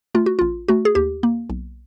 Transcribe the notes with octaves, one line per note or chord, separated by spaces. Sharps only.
A3 F4
F#4
A1 F4
A3 F#4
G#4
D#2 G4
A#3
B1